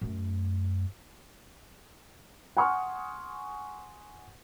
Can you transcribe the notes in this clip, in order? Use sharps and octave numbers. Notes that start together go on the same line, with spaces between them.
F#2 A3
F#5 G#5 C6 C#6 D#6 F6